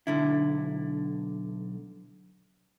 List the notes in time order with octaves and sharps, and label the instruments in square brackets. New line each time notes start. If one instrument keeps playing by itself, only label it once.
[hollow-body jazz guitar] B1 D3 E4